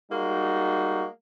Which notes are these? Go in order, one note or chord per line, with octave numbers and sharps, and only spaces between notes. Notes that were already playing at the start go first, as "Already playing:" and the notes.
G3 G#3 A#3 D#4 F#4